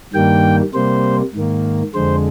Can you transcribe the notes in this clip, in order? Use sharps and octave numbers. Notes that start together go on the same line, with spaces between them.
G2 D#3 G3 A#3 G5
C3 G3 A#3 C5
G#2 D#3 A#3
F2 D3 G#3 C5